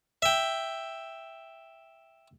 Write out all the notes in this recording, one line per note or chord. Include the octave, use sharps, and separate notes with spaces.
E5 G5